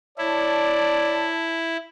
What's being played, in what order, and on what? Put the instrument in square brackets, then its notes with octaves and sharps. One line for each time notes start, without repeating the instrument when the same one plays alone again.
[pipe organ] E4 [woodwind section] C#5 A5 [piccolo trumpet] D5